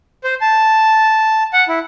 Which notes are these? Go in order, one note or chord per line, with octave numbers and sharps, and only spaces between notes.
C5
A5
F#5
E4